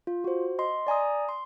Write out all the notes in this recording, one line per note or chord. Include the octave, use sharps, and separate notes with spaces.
F4
F#4 C5
D#5 C6
D5 G#5 A#5 D#6
C6